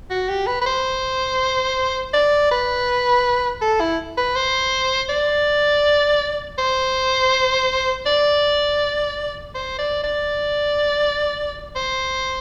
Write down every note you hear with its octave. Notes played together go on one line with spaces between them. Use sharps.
F#4
G4
B4
B4
C5
D5
B4
A4
E4
B4
C5
D5
C5
D5
C5
D5
D5
C5